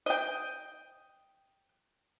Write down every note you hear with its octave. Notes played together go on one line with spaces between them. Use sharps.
D#5 G5